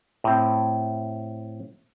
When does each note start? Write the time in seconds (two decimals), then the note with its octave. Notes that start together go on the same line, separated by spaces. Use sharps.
0.24 A2 C4